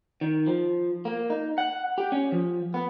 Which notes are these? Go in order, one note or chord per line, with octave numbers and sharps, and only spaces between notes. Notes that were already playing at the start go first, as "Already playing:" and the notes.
D#3
F3
A#3
D#4
F#5
G4
C#4
F3
B3